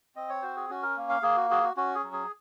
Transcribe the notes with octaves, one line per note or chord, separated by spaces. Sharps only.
C4 D#5
C#5
F#4 C5
G#4
C#4 F#4
A#4
A#3
F5
A#3 G#4
F#4
F#4 G#4
F#4
C#4 F#4
G#4
F#3
G#4